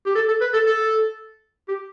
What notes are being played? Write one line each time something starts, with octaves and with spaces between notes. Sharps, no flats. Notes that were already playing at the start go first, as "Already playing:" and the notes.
G4
A4
A4
B4
A4
A4
G4